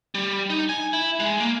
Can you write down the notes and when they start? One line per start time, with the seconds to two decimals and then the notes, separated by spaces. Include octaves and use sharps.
0.15 G3
0.50 D#4
0.69 G#5
0.93 E4
1.20 G#3
1.39 A#3